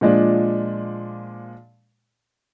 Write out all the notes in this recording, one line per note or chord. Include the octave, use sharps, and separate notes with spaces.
A#2 F3 G#3 D4